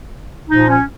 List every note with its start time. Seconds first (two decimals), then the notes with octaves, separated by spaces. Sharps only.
0.48 A#2 F3 D#4
0.67 C#4